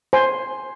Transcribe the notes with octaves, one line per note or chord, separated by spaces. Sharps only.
C5 G#5 C6